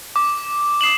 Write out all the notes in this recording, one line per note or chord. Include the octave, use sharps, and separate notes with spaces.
D6
D#6 C7 E7 F#7